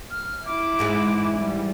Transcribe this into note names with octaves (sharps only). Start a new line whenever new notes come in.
F6
E4 D6
G#2 E3 G#3
G3